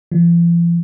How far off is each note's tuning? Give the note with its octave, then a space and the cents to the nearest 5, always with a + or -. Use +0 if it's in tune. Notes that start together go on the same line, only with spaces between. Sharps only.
F3 -45